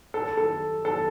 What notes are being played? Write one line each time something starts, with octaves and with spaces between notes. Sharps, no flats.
A4
A4
A4